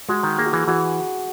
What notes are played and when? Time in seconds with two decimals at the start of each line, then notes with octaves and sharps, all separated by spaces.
0.09 G#3 F#4
0.23 D#3
0.38 A#3 G#4
0.46 F#4
0.53 E3 G#4
0.68 E3 F#4